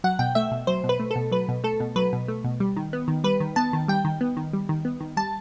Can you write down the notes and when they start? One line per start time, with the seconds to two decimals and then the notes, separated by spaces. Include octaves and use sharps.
0.04 F#3 F#5
0.19 B2 G5
0.35 A3 E5
0.51 B2
0.67 F#3 C5
0.84 B2
0.89 B4
1.00 A3
1.11 B2 A4
1.32 F#3 B4
1.48 B2
1.64 A3 A4
1.80 B2
1.96 F#3 B4
2.13 B2
2.28 A3
2.44 B2
2.60 G3
2.76 D#3
2.93 B3
3.08 D#3
3.24 G3 B4
3.40 D#3
3.56 B3 A5
3.73 D#3
3.88 G3 G5
4.05 D#3
4.21 B3
4.37 D#3
4.53 G3
4.69 D#3
4.85 B3
5.00 D#3
5.17 G3 A5